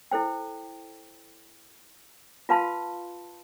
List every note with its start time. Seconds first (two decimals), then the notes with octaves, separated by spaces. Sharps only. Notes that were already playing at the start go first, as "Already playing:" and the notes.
0.11 E4 A4 C5 G5
2.49 F4 B4 F5 A5 C6